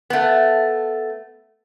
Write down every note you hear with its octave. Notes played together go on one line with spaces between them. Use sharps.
A3 B3